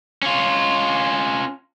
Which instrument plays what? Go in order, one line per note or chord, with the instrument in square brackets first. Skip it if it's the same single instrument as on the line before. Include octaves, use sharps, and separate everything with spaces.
[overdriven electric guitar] C#4 F4